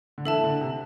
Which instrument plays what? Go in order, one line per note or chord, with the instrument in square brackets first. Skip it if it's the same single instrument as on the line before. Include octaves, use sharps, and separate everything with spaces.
[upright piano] D3
[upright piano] E3 [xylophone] A4 E5 A5
[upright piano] D3
C3